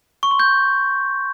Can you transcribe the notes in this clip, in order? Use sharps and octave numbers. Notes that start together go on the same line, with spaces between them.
C#6
C6
G6